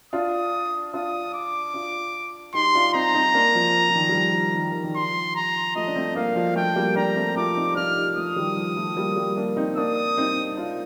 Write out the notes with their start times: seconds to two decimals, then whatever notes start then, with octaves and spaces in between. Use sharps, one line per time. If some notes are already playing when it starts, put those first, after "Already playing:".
0.13 D4 F4 D#6
0.94 D4 F4 D#6
1.34 D6
1.74 D4 F4
2.54 D#4 G4 C6
2.75 D4 F4
2.94 C4 D#4 A#5
3.14 C4 D#4
3.34 A#3 D4
3.55 F3
3.89 F3
3.95 D#3
4.09 G3
4.14 F3
4.55 D#3
4.72 D#3
4.84 D#3
4.95 F3 C6
5.35 A#5
5.75 F3 A3 D#5
5.88 D4
5.95 A3 C4
6.15 A#3 D4 F5
6.36 F3
6.55 F3 A3 G5
6.76 G3 A#3
6.96 A#3 D4 A#5
7.16 A3 C4
7.36 F3 A3 D6
7.56 C4 D#4
7.76 D4 F4 F6
7.96 D#4 G4
8.16 F3 A3 D#6
8.36 D#3 G3
8.57 F3
8.77 F3 A3
8.96 G3 A#3
9.17 G3 A#3
9.37 A#3 D4
9.57 C4 D#4
9.76 A#3 D4 D#6
10.18 C4 D#4
10.57 D4 F4